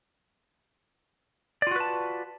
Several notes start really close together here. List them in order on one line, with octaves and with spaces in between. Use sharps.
D5 F4 F#4 B4 A5